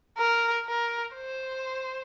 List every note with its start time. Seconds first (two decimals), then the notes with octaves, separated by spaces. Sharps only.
0.18 A#4
0.67 A#4
1.14 C5